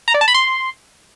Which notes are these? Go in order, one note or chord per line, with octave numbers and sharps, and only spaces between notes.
A#5
D5
A5
B5
C6